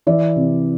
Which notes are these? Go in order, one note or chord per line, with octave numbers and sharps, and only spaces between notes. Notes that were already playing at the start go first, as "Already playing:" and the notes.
E3 D5 E5
C3